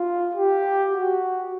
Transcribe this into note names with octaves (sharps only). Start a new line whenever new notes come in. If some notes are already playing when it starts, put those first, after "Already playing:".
Already playing: F4
G4
F#4